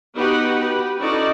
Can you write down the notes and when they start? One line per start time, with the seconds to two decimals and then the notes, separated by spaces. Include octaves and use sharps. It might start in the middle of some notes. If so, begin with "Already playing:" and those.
0.16 B3 D#4 F#4 G4 B4 F#5
0.58 G4 B4
0.98 C#4 D#4 E4 F#4 A4 D5